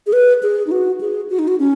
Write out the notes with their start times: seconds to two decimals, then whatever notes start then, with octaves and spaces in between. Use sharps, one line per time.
0.07 G#4
0.13 B4
0.43 G#4
0.67 D#4
0.71 F#4
1.01 G#4
1.30 F#4
1.39 D#4
1.48 F#4
1.59 C#4